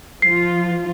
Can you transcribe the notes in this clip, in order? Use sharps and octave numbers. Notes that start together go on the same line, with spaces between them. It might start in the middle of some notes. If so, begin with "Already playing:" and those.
F3 F4 C7